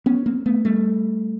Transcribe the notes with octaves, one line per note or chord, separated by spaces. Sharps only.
B3 C#4
A#3 C4
A3 B3
G3 A3